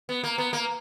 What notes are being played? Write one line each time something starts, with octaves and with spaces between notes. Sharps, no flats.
B3
A#3
B3
A#3